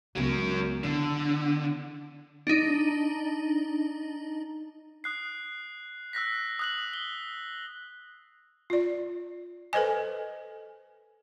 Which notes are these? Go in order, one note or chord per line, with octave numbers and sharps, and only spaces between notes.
C#2 F#3 B3 A#4
D3 E3 B3
D4 D#4
D#6 F#6 C7
E6 F#6 A#6 B6
D#6 F#6 F#7
G7
F4 D5
A4 B4 C5 D#5 G#5